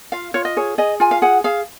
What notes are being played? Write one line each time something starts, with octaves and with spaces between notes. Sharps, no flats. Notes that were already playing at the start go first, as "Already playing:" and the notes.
F4 F5
F4 C#5
D#5
G#4 C#5
G#4 D#5
F4 G#5
F5
G#4 F#5
G#4 F5